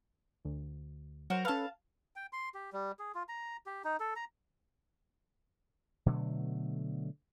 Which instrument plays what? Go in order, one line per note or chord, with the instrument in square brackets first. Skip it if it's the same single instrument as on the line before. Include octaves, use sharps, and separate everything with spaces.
[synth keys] D2
[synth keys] F#3 [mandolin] F#4 A#4 C5
[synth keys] C#4 A4 B4 [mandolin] F5 A5
[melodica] G5
C6
G4
G3
G#4
F4
A#5
G4
D#4
A4
A#5
[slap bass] B2 D3 F#3 A3